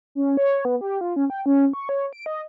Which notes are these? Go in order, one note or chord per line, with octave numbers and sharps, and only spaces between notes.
C#4
C#5
B3
G4
F4
C#4
G5
C#4
C#6
C#5
D7
D#5